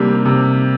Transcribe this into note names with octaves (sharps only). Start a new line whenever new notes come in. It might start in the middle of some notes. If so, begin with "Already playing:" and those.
Already playing: C3 G3 A#3 D4 G4
C3